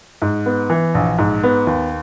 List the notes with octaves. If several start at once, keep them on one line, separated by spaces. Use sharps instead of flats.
G#2
B3
E3
A#1
G#2
B3
D#2